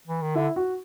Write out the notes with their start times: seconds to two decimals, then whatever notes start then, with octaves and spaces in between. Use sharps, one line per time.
0.07 E3
0.22 D#3
0.35 D3 E4
0.56 F#4